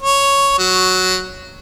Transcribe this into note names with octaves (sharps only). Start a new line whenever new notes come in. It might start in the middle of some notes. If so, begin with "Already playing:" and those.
C#5
F#3